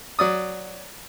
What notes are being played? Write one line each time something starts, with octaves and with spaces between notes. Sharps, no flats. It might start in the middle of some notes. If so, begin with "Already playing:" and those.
F#3 D5 D#6